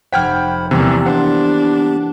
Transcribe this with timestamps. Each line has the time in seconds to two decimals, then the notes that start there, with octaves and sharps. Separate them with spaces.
0.13 F1 C5 F#5 G5 B5 F6 G#6 B6
0.71 E2 C3 E3 G3 A#3 B3 G4
1.06 D4 C5 F#5